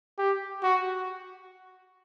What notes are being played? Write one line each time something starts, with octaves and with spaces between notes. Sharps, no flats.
G4
F#4